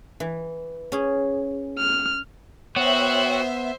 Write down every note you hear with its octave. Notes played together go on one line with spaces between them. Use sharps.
E3
C#4 G#4
F6
B3 F#4 C5 C#5 E5 G5